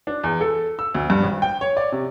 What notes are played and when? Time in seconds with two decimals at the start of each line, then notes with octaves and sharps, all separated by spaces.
0.07 D4
0.23 E2
0.41 A4
0.79 E6
0.95 D2
1.10 G2
1.23 G#1
1.42 G5
1.61 C#5
1.77 D5
1.92 C3